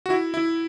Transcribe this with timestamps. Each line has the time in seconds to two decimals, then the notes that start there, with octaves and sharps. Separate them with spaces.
0.06 F#4
0.10 E4
0.34 E4